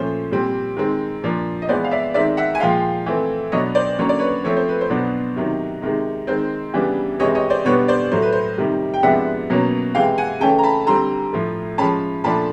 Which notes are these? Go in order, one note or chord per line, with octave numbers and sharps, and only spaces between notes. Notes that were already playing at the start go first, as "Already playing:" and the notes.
Already playing: A#2 F3 A3 C#4 C5
A#2 G3 C4
D#3 G#3 C4
A#2 F3 A#3 D4
D#5
E3 G#3 B3 C5 D5
F5
D5 E5
D#3 G#3 C4 D5 E5
E5 F#5
G#5
A#2 F3 G#3 F5 G5
E3 A3 C4
B2 F#3 B3 D4 C#5 D#5
C5 D5
D3 F#3 A#3 C#4 C#5
D5
B4 C#5
F3 A3 C4 C#5
C5
B4
C5
B2 F#3 B3 D4
C3 D#3 F#3
C3 D#3 G#3
D#3 G#3 C4 C5
C#3 E3 G3 B3 D4
C3 E3 G#3 C#5 D#5
C#5 D#5
C5 D5
B2 G3 B3 D4 B4 C#5
C5 D5
A2 F#3 A3 C5
B4
C5
C3 D#3 G3
G5
C3 F3 G#3 B3 D4 E5 F#5
B2 F#3 A#3 C#4
C3 E3 G#3 F5 G5
F#5 G#5
C#3 E3 A3 C#4 G5 A5
A#5
A5 B5
D3 G3 C4 A#5 C6
A2 F3 A3
F3 G#3 C#4 A5 B5
A#2 F3 A3 D4 A5 B5